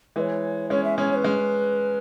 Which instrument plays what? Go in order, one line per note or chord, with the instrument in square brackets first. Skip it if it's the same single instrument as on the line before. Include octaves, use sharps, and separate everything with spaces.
[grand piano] E3 G#3 [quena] C#5 E5
[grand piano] G#3 C#4 [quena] C#5
[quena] E5
[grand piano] G#3 C#4 [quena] C#5
[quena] C#5
B4
[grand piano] G#3 C#4